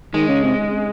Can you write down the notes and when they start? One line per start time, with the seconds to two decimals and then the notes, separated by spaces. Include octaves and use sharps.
0.14 D#3 G#3
0.28 C#3
0.43 C3